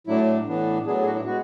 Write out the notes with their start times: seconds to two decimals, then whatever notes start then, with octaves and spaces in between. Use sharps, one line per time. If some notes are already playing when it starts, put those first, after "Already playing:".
0.07 A2 F#3 A3 D4 E4
0.46 A2 E3 B3 D4
0.85 A2 F#3 B3 D4 G#4
1.01 G#4
1.06 F#4
1.16 E4
1.25 G#3 B3 F#4